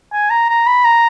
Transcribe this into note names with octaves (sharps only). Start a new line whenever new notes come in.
G#5
A#5
A#5
B5
A#5